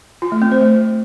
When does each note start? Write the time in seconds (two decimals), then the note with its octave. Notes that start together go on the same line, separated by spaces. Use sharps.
0.22 F4
0.32 A3
0.42 C4
0.51 C5
0.61 A3